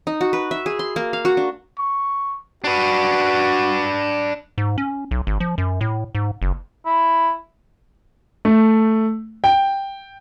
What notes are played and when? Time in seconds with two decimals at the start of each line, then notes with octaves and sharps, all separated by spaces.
0.07 D#4
0.21 F#4
0.33 B4
0.51 E5
0.66 G#4
0.79 C6
0.96 A#3
1.13 F5
1.25 F#4
1.37 D4
1.78 C#6
2.64 D4 F#4 B4
4.58 G#2
4.78 C#4
5.11 B1
5.27 G#1
5.40 F3
5.58 F#2
5.81 A2
6.15 G#2
6.42 F#1
6.86 E4
8.45 A3
9.44 G5